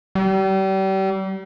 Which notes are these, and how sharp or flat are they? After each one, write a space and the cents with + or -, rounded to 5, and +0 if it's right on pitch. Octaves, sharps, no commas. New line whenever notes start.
G3 -35